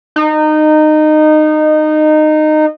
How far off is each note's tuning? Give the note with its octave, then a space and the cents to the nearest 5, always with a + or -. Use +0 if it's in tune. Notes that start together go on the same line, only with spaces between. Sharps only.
D#4 -20